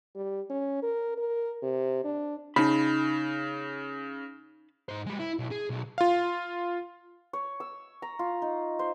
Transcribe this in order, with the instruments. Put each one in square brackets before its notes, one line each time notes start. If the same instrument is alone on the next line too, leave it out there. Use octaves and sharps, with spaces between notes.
[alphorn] G3
C#4
A#4
A#4
C3
D4
[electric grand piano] C#3 [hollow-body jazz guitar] D#4 A5 B5
[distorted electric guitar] G#2 C5
G3 G#3
E4
B1
G#4
B1
[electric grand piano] F4 F5
[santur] C#5
E6
A#5
F4
D#4
C5